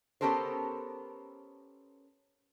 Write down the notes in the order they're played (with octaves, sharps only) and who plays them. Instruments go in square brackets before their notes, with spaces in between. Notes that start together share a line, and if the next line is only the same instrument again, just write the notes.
[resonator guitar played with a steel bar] B3 C#4 G4 A4 A#4 C5